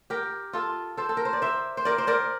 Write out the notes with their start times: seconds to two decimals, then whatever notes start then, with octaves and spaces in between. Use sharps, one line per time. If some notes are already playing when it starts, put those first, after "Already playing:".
0.10 G4 A#4
0.53 F4 A4
0.97 A4 C5
1.09 A4
1.17 A#4
1.25 C5
1.33 D5
1.42 C5 E5
1.77 C5
1.85 A#4 D5
1.98 C5
2.07 A#4 D5